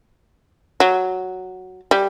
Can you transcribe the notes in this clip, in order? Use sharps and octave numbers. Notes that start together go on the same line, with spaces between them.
F#3
G3